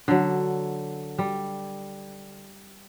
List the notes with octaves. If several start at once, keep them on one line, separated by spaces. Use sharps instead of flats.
D3 F#3
G3